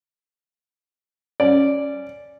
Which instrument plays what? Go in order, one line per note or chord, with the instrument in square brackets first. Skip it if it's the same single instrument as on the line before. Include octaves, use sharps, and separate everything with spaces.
[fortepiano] C#4 D5